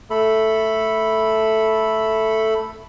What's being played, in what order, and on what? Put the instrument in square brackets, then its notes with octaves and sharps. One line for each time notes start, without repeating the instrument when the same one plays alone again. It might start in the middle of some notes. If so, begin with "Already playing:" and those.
[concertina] A3 A4 B5